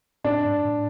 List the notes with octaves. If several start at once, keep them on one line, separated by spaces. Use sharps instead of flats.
A2 D4
G#2
A2